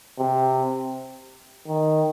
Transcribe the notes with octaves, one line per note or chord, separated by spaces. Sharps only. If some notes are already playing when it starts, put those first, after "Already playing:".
C3
D#3